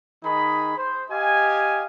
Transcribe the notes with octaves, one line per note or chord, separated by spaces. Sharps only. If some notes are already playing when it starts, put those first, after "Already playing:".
D#3 D#4 G#4 B5
C5
G4 D#5 F5 G#5